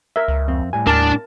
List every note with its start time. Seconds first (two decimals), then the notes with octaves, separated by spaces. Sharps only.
0.16 A#4 E5
0.28 C#2
0.48 F2 C4
0.73 A2 G3 G#5
0.87 D#2 D4 A#4 D5 A5